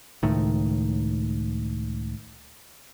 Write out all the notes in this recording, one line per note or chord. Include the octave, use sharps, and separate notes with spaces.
C#2 A2 D#3